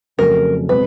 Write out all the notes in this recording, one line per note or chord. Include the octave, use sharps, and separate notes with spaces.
F2 C#3 F#3 A3 C#4 A#4
B2 G#3 C4 B4